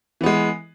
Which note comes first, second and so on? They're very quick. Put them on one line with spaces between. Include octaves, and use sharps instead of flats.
E3 B3 G#3